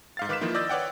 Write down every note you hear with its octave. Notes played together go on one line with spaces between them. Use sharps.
G#2 F5 A6
D#3 B4 D6 F6 B6 E7
D#3 F3 A#3 D#4 E4
D5 D#5 E6 G6 A6
B4 C#5 D5 F#5 G5